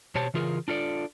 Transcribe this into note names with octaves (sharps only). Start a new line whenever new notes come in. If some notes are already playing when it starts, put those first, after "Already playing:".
B2 G4 C5 C#5 A5
C#3 E3 F4 G#4 A#4
D4 F4 A4 D5